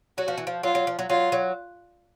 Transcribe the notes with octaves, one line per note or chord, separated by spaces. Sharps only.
F#3 F#4
F3
E3
F3
F#3 F4
F#3
F3
F#3
F#3 F4
F#3